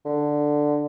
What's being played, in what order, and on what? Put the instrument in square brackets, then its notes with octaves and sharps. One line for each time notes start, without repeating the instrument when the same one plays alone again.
[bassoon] D3